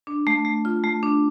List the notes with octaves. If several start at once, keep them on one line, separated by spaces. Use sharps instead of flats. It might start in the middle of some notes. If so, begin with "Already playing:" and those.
D4
A3
A3
F4
A3
D4